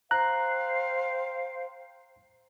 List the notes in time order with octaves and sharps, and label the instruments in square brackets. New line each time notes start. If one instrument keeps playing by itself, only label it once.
[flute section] C5 F5 G5 [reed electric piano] A#5 F#6